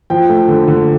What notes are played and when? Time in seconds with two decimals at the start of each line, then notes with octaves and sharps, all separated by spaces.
0.10 F3 G5
0.29 A3
0.48 D3
0.68 D3